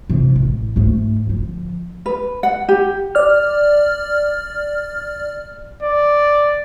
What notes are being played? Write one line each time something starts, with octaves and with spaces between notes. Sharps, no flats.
C3 E3
A1
G#2 A3
D3 F3
B4
F#5
G4
D5 F6
D5